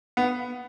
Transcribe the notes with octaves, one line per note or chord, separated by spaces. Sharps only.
B3